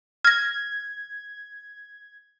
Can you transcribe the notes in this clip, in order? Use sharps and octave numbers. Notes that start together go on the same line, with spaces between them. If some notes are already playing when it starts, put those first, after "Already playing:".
F6 G#6 A#6